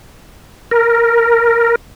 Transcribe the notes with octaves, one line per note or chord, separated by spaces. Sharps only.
A#4